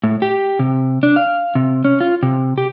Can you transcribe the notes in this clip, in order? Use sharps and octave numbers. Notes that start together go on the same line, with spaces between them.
A2
G4
C3
D4
F5
C3
C#4
F4
C3
G4